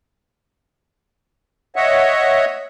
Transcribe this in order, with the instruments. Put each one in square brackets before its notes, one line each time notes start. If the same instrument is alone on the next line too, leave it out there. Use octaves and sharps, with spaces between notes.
[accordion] C#5 D#5 E5 F#5